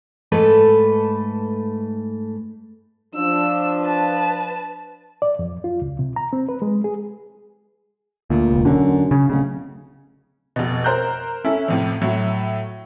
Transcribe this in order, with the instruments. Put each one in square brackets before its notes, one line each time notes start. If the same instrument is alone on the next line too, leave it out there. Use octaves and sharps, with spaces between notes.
[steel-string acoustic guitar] G#2 A3 A4 B4
[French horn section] F3 D4 [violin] E6
[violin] B4 A5
[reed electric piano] D5
F2
F4
C#2
C3
A#5
C4
B4
G#3
G#4
[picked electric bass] D2 [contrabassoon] A#2
[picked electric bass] E1 C#2
[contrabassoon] F#2 [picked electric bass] D3
[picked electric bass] C#3
[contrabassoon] D1 [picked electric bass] C#3
[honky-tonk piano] F1 B2
A#4 C5 A#5 F#6 G6
C#4 E4 A4
F2 A2 C3
A2 F#3 E4